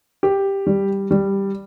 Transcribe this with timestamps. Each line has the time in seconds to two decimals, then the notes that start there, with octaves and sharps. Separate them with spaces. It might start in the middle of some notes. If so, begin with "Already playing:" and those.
0.23 G4
0.67 G3
1.11 G3